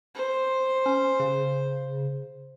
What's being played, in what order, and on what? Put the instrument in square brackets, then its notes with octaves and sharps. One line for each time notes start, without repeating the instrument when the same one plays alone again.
[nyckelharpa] C5
[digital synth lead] C#4
C#3